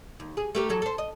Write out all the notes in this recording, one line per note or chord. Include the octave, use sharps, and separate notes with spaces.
D#2
G#4
A3 G4 A#4
E2 F#3 A4
A4 C5
D#5